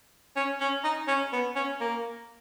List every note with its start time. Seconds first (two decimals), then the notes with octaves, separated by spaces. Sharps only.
0.36 C#4
0.60 C#4
0.84 D#4
1.08 C#4
1.33 B3
1.56 C#4
1.81 A#3